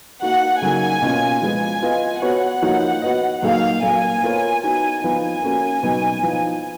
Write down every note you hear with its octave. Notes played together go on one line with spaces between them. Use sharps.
A#3 D#4 F#4 F#5
C#3 F#3 A#3 D#4 A#4 G#5
B2 A#3 C#4 F4
F3 G#3 B3 G#5
B3 F4 B4 D#5
B3 F#4 C#5 F#5
F3 A#3 D#4 F#4 C#5
B3 F#4 B4 D#5
A#2 F#3 A#3 D#4 G#4 F5
A#2 F#3 A#3 G#5
B3 F4 A#4 C#5
B3 D#4 F#4 G#5
F3 B3 D#4 G#5
A#3 C#4 F#4 A#4
B2 F#3 B3 D#4
F3 B3 D#4